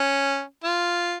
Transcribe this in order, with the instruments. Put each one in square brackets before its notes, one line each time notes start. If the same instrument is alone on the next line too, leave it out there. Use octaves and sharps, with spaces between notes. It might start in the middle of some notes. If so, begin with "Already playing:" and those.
Already playing: [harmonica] C#4
F4